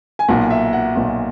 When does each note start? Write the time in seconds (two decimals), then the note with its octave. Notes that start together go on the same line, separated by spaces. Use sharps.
0.19 G#5
0.28 B1 A#2 F#5
0.50 E5
0.73 F#5
0.95 B1 A#2